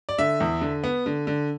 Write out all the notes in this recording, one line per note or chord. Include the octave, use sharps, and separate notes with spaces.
D5
D3 E5
E2
D3
B3
D3
D3